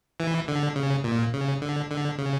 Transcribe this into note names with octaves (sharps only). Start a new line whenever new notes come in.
E3
D3
C#3
A#2
C#3
D3
D3
C#3